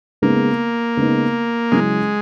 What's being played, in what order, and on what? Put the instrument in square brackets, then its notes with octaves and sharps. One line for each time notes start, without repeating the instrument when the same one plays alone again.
[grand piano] C#3 G#3 B3 D#4 [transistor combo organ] A#3
[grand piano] C#3 G#3 B3 D#4
[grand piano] C#3 F#3 C#4 E4 [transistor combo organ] G#3